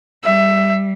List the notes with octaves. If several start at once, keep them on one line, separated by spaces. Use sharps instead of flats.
G3 E5